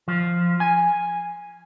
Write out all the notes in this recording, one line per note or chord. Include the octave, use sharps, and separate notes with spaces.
F3
G#5